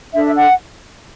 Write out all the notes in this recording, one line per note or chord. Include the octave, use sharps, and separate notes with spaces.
D4 A4 E5
F#5